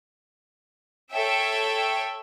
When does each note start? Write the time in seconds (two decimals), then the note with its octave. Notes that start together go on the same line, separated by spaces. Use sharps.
1.12 A4 C#5 E5 G5